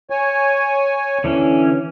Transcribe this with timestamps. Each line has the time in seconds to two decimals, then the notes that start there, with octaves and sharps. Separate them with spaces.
0.10 C#5 G#5
1.24 D3 E3 C#4